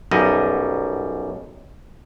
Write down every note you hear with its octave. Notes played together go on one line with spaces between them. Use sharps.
B1 F#2 G3 D#5